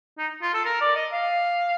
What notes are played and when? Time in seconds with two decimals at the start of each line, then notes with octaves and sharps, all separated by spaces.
0.18 D#4
0.42 F4
0.54 A4
0.65 A#4
0.81 D5
0.95 D#5
1.12 F5